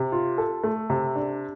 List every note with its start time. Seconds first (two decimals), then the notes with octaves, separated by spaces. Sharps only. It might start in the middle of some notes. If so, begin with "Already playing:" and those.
Already playing: C3
0.12 F4
0.38 A4
0.64 A3
0.90 C3
1.15 D4